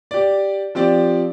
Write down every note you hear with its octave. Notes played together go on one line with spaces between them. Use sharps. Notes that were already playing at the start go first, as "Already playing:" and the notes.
G4 D5
F3 C4 G4 D5